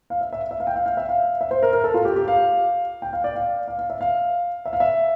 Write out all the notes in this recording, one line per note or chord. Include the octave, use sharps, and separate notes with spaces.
F5
E5
E5
E5
F5
G5
F5
F5
E5
F5
E5
C5
A#4
A#4
A4
F4
G4
G4
F5
G5
F5
D5
F5
F5
F5
E5
F5
E5
F5
E5